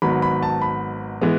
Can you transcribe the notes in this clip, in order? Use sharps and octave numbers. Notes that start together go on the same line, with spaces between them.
G#1 G#2 F#3 B3 B5
B5
A5
B5
E3 G#3 B3